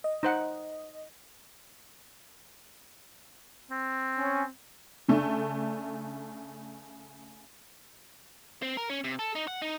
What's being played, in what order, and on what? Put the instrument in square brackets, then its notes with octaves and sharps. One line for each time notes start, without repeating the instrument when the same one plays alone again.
[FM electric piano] D#5
[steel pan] D#4 C5 F#5
[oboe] C4
[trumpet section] C#4
[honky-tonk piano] C#3 A3 D4
[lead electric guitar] C4
A#4
C#4
C3
A4
D#4
F#5
D#4